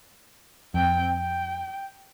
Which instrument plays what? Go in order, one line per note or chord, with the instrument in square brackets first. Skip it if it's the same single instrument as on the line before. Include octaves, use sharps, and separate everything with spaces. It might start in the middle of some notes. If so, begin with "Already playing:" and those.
[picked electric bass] F2 [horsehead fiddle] C4 G5
[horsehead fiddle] G5